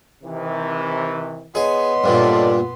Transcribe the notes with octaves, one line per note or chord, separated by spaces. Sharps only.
C3 D#3 E3
B3 G#4 C#5 D#5 C6
G2 A#2 A4 D5